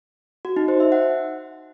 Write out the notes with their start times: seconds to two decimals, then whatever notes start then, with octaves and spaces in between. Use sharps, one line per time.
0.45 F#4
0.56 D#4
0.68 C5
0.80 E5
0.92 F#5